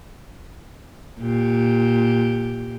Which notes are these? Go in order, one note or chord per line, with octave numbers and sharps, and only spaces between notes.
A#2 G4